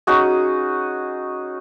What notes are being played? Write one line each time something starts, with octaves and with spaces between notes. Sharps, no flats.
C#4 D#4 F#4 G#4